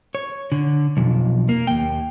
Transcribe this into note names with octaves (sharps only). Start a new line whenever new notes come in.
C#5
D3
B1 F2
A#3
D#2 G5